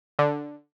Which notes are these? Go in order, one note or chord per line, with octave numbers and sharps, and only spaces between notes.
D3